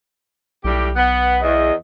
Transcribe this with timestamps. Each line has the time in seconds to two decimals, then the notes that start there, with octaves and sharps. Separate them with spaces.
0.65 B1 A2 G3 G4
0.96 B3
1.42 E2 D#5